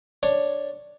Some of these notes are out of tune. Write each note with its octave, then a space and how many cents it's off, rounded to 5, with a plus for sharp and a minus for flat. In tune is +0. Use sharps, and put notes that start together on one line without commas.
D4 +0 C#5 -5